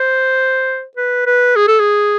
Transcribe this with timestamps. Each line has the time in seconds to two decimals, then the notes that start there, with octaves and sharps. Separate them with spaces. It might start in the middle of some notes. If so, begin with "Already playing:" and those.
Already playing: C5
0.96 B4
1.26 B4
1.56 G#4
1.68 A4
1.80 G#4